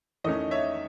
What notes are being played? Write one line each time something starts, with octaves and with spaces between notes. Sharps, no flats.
E2 D#3 A3 C#4 D#5
C#5 E5